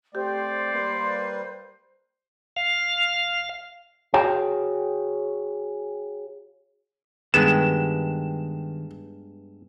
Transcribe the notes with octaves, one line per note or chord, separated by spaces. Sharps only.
A3 C4 G4 C5 D5
G3 A#3 B4
F5
F#4 G#4 C#5 F5 G5
G2 D#3 G#3 B3 G4 E7